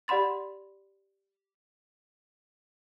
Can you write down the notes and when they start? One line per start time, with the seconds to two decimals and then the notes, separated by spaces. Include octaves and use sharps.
0.08 G4 D5 F#5 B5 C6 A6